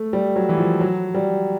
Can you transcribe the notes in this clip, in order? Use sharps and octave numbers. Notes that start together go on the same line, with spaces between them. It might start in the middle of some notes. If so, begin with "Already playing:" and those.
Already playing: A3
G3
F#3
E3
F3
F#3
G3